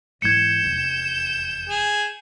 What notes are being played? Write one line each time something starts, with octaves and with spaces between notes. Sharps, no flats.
G#2 E3 G6 G#6 C#7 E7
F1 E2
G#4